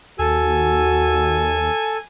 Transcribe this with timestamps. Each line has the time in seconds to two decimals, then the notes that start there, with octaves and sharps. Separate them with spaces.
0.19 D#2 F#4 A4 G#5 E6